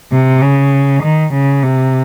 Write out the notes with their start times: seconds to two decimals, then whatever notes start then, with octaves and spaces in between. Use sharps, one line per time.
0.12 C3
0.42 C#3
1.03 D#3
1.33 C#3
1.63 C3